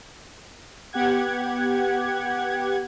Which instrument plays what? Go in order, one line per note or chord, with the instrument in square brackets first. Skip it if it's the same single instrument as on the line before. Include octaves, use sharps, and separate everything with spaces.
[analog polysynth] B3 G4 F#5 G#6